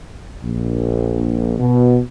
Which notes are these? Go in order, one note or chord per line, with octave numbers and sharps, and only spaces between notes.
A#1
B2